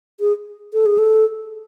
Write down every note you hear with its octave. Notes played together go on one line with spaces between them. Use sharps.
G#4
A4
G#4
A4